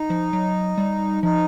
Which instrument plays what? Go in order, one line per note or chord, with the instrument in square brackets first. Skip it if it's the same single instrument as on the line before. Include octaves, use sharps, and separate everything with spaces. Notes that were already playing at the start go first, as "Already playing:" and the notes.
Already playing: [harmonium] D#4
[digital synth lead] F3
F#3
G3
[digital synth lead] F3 [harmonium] D#4